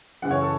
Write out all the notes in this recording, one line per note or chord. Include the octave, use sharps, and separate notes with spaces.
F#2 C#3 E3 F#5
C#5
A4